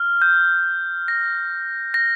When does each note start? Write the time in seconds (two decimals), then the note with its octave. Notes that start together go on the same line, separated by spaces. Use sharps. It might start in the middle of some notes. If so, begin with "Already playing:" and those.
Already playing: F6
0.22 G6
1.08 A#6
1.94 A#6